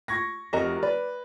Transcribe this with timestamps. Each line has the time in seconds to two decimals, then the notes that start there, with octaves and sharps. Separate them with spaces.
0.08 C#6 G#6 A#6
0.53 F1 C3 F#4 A#4 D#5 A#5
0.83 B4 D5